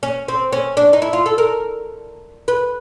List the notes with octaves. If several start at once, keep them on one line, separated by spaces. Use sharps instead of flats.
C#4
C4
C#4
D4
D#4
E4
F4
A4
A#4
B4